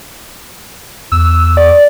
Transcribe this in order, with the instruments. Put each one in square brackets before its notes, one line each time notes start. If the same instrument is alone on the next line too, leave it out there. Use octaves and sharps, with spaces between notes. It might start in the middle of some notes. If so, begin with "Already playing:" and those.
[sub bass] E2 [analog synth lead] E6
[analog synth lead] D5